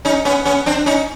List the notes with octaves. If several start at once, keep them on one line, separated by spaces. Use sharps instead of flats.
C#4 D#4
B3 C#4
B3 C#4
C4 D4
C#4 D#4